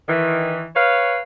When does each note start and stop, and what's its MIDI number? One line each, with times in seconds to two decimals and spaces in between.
0.09 0.68 51
0.09 0.68 52
0.76 1.20 71
0.76 1.20 73
0.76 1.20 77